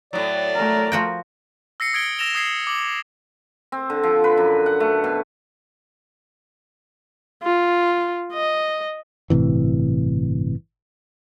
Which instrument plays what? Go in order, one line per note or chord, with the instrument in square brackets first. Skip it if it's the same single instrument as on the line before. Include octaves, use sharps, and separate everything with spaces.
[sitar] A2 F#3 [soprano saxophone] D5
[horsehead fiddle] A3 A#4
[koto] F3 F#4 G5
[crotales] E6 A#6 C7 C#7
D#6 G#6 D7 G7
E6 A#6 E7 F7 G7
D#6 G#6 C7
D6 F#7
[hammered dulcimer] C4
D3
F3
B4
F#2
F#5
A3
B2
[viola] F4
D#5
[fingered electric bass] G1 A2 C3 E3